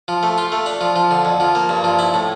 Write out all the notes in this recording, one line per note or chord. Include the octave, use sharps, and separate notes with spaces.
F3
A3
F4
A3
D4
F3
F3
D3
F2
F3
A#3
G2
F3
E4
A2